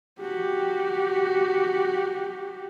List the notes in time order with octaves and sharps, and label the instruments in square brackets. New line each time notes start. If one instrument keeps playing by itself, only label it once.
[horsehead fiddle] F#4 G4